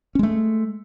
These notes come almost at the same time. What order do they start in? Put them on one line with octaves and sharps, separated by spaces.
C#4 G#3 A3